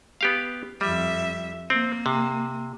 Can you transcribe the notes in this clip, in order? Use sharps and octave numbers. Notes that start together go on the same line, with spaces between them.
B3 G4 F5
F2 G3 E5
A#3 C4
C3